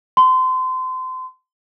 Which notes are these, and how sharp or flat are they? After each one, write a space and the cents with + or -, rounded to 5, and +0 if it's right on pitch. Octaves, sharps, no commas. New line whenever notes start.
C6 -30